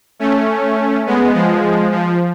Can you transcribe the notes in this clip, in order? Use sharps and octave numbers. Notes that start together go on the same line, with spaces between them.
A3 C#4
G#3 B3
F3 G#3
F3